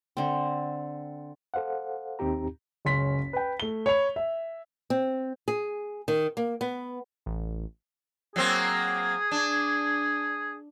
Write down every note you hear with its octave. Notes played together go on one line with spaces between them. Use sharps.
D3 C4
A4 C5 F5 F#5
D#2 C4 D#4 G4 A#5
F#1 C#2 C#4 C6 B6
B4 G5
A3 G7
C#5 B5 F7
E5
C4
G#4
D#3
A#3
B3
A1
F#3 A#3 C4 G#4
D4